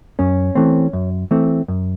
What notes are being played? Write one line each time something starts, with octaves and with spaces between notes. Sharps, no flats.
F#2 C#4
E3 A3 C4
F#2
E3 A3 C4
F#2